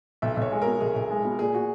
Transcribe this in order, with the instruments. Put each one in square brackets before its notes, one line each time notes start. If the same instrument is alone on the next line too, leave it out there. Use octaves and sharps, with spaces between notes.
[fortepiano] B1 [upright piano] E5
[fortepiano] B1
[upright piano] C#5
[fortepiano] G#3
[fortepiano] B2 [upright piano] A#4
[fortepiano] B1 [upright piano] G#4
[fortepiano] B1
G#3
B2
[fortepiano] A#2 [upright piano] G#4
[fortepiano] F#4